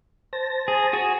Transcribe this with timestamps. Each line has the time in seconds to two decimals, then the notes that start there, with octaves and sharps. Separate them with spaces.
0.33 C5 A5 A#6
0.68 G#4
0.93 F#4 G#4